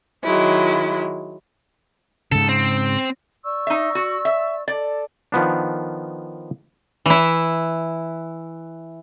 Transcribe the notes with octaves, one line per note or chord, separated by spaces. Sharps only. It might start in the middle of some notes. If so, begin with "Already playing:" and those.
D#3 F#3 G#3 E4
G#2 C#3 A4
C4
D5 C#6 E6
D#4 E5
F#4
E5
A4 D5
D#3 F3 B3 D4
E3 E4